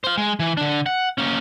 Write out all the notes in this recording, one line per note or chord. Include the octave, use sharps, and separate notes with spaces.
C5 F5
G#3
E3
D3 D4
F#5
A#3 C#4